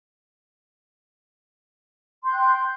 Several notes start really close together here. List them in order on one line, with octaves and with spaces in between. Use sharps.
C6 G6 F#6 G5